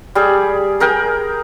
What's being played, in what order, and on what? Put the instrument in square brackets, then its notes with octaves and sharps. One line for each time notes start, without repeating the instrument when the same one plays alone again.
[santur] G3 G#4
G#4 A#4 G5